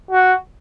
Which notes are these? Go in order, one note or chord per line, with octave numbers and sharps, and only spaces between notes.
F#4